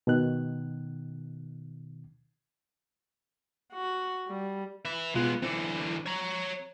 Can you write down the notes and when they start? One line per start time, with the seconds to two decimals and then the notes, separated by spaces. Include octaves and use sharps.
0.07 B2 D#3 F#6
3.73 F#4
4.27 G3
4.85 B4 E5
5.15 B2 G#3 B3 F4 F#6
5.42 D3 E3 C4
6.06 C#5 A#5